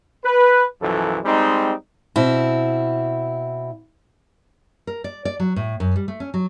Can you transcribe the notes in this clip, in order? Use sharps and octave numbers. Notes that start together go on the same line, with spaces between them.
B4
B1 F#2 E3 F3 A4
G3 G#3 C4 D#4
B2 C4 E4
A#4
D5
D5
F#3
A2
F#2
G3
A3
C#4
F#3